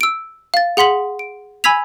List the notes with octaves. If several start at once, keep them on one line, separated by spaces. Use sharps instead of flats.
E6 D7
F5 A6
G#4 F#5 C6 B6 F#7 G7
D7
G#5 B5 E6 G#6 B6 F7